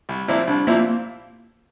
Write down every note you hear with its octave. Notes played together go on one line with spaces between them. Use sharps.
C2
A#2 F3 C4 E4
C2 D4
A#2 F3 A#3 C4 E4
A#3
A#3